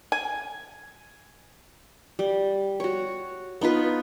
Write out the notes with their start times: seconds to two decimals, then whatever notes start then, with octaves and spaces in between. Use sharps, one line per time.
0.12 G#5
2.19 G3
2.80 F#4 C#5
3.61 B3 D#4 F4 B4